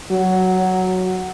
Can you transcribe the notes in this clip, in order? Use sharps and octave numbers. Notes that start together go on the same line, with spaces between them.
F#3